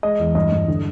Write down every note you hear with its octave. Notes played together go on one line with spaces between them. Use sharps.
G#3 D#5
E2
G2 D#5
G2
D3